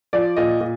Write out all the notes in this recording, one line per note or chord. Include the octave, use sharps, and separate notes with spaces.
F3 D5
A#2 D#5
A#2